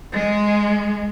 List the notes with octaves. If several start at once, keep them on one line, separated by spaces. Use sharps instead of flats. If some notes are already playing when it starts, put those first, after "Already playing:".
G#3